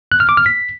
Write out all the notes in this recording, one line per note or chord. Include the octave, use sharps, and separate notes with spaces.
F#6
F6
D6
F6
B6